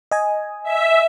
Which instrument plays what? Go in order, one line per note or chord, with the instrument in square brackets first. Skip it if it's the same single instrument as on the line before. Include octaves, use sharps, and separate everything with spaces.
[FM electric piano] D#5 G#5
[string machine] E5